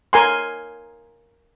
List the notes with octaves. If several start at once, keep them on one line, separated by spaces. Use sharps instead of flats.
A#4 G#5 C6